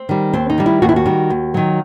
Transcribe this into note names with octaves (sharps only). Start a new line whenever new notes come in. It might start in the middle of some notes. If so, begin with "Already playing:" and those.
Already playing: C4
D#3 G3
D#2 C4
D#4
D#3 G3
E4
D#2 F#4
E4
F#4
D#3 G3
D#2
D#3 F#3